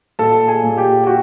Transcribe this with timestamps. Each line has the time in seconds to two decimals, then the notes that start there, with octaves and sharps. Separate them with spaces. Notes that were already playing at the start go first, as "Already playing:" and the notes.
0.19 A#2 A4 A5
0.48 G#4 G#5
0.63 A#2
0.77 G4 G5
1.04 G5
1.07 F#4